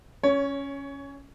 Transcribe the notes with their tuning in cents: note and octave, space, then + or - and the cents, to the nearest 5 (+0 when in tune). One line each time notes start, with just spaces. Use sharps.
C#4 +0 C#5 +20